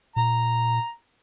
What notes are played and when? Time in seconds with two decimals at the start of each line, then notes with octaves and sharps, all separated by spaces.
0.16 A#2 A#5